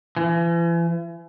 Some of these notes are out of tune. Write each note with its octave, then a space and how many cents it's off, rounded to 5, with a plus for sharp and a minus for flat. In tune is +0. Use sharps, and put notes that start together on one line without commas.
E3 +40